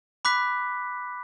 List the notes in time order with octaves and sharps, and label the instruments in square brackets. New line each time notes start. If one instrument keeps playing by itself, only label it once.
[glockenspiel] B5 D6 F#6 B6